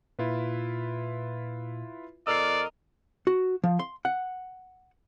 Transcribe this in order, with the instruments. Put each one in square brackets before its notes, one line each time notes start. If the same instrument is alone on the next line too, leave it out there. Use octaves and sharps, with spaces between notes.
[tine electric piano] A#2 [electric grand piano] E4 F4 B4
[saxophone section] F2 A#4 D#5 [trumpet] D5 [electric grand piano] E6 F6 C7
[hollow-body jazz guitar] F#4
F3
C6
F#5